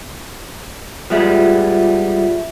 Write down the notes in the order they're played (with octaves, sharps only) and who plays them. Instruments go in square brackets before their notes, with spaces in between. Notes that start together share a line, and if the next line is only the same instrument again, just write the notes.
[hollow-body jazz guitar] G3 G#3 B3 [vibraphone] F4 E5